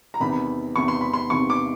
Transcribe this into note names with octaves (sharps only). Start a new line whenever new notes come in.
A#5
E2 C3 D#3 B5
E2 C3 D#3 C#6
C6
B5
C6
E2 C3 D#3 C#6
D6